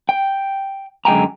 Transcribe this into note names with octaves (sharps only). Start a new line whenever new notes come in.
G5
F#2 D3 G#3 G5 G#5 A#5